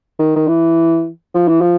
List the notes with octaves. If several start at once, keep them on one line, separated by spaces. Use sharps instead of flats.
D#3
D#3
E3
F3
E3
F3